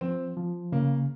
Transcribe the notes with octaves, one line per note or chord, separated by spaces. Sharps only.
F3 C4
F3
C#3 A#3